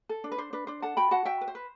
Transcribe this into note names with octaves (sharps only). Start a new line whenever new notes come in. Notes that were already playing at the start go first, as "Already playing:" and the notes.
A4
D4
B4
D4 C5
D4 B4
D4 C5
A4 F#5 A5
F#4 G5 B5
F#4 F#5 A5
F#4 E5 G5
B4
C5
B4